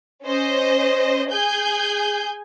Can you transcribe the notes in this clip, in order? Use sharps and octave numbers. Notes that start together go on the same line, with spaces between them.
C#4 C5 D#5
G#4 G#5 G6